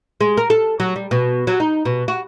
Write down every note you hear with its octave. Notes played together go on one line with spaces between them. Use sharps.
G#3
A#4
A4
F#3
G3
B2
F#3
D#4
B2
F#4